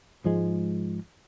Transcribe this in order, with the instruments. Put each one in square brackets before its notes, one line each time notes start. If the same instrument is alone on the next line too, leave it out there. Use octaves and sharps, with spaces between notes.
[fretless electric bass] G#2 F3 G#3